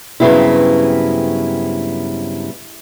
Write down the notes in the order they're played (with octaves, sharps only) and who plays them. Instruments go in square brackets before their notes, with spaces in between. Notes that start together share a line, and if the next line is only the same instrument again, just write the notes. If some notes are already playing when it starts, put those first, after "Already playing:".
[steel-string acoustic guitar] G2 C#3 F#3 B3 C4 E4